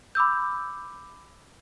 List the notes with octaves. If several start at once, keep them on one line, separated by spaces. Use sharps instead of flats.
B5 D6 E6 G6